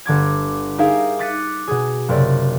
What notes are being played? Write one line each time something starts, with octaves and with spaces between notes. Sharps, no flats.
G1 D3 D6 G#6
D#4 G4 G#4 A#4 E5 F5
D6 F#6 A6 B6 C#7 D#7
B2 G#4
F#1 C3 D5